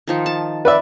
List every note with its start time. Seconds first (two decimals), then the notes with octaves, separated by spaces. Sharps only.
0.08 D#3 F3 D#4
0.26 A5
0.65 B4 D5 E5